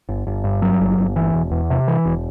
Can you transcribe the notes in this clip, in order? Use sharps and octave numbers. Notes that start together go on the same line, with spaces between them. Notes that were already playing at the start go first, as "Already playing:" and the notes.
G1
G1
G2
F#3
G1
G1
E3
E1
E2
C3
E3
E1